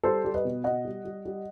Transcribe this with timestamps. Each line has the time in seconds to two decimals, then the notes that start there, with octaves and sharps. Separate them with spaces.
0.03 G3 A4 C5
0.25 G3
0.34 B4 D#5
0.45 B2
0.64 B2 D#5 F#5
0.85 G3
1.05 G3
1.25 G3